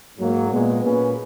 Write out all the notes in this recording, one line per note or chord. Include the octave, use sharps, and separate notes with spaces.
G#2 F#3 A#3
A#2 G#3 B3
A#2 A#3 C#4 G#4 B4